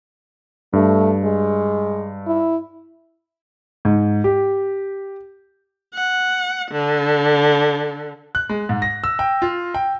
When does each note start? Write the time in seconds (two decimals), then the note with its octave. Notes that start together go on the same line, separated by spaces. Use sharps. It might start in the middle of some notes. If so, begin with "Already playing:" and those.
0.73 G2 A3
1.24 G#3
2.27 E4
3.85 G#2
4.24 G4
5.95 F#5
6.72 D3
8.35 F#6
8.49 G#3
8.69 G#2
8.82 A#6
9.04 E6
9.19 G5
9.42 F4
9.74 G5